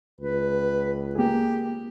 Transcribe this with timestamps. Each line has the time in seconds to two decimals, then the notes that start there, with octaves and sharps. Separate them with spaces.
0.20 C#2 B4
1.15 A#3 G4 G#4